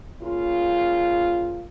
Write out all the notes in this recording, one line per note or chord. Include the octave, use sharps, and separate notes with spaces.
C#3 A#3 F4